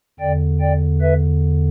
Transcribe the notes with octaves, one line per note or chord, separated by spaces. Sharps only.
E2 D3 D5 G5
D5 G5
B4 E5